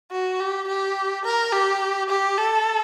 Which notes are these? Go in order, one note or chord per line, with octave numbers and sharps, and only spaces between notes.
F#4
G4
G4
A#4
G4
G4
A4